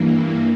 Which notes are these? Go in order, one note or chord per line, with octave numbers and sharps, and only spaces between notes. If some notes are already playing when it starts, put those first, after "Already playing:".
Already playing: G2 E3 A#3